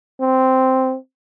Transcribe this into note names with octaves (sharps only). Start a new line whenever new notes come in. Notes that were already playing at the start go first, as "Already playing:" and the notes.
C4